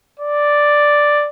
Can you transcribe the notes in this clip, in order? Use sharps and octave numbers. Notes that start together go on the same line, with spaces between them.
D5